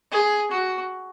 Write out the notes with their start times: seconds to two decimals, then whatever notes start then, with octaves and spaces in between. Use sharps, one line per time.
0.12 G#4
0.51 F#4